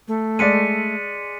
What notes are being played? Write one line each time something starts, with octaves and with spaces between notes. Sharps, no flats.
A3
G#3 D5 B6 C#7 D#7